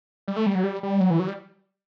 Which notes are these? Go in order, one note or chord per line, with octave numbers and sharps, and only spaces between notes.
G3
A3
G3
F#3
G3
G3
F#3
E3
F#3
G3